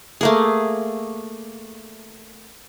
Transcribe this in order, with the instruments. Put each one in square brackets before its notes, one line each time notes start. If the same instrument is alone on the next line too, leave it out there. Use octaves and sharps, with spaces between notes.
[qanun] A3 A#3 G#4